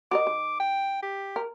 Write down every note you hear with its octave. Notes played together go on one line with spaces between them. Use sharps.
F#4 A#4 D#5 D6
D#3
G5
G4
A#4